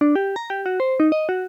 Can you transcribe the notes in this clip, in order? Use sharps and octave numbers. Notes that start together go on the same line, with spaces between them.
D4
G4
A#5
G4
F#4
C5
D#4
D#5
F#4